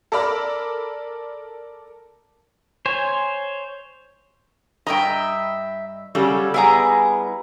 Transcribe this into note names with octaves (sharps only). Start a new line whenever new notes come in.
A4 A#4 D5 B5 F6
C5 C#5 G#5
G2 D#5 E5 G5 A#5
C#3 F#3 G3 A4
G3 B3 E4 G#4 A#5